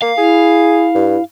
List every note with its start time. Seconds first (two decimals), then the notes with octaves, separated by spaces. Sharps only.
0.02 A#3 F5
0.17 E4 G#4
0.95 G2